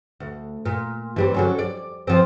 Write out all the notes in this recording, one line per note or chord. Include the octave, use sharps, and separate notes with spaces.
D2
A#2
E3 G3 C4
D3 F#3 C#4
D5
F3 C4